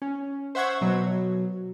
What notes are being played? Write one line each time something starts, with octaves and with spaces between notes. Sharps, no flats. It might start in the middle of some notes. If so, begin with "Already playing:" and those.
C#4
C5 E5 F#5 C#6 G#6
B2 F#3